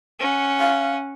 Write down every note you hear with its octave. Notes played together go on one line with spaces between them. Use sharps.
C#4 F#5
F5